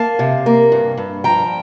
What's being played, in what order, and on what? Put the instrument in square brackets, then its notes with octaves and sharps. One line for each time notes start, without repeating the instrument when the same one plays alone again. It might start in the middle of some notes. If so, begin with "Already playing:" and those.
Already playing: [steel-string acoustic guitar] A#3 F5 A5
C3
A#3
G2
G2
F3 G5 A#5